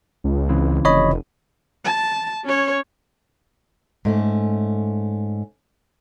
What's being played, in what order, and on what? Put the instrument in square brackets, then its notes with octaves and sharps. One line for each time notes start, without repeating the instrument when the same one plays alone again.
[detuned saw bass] C#2
[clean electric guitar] C#3 E3 C4
[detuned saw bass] F1 [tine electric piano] C#5 D#5 B5
[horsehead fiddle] A5
C#4 C#5
[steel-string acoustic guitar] G#2 A3 C#4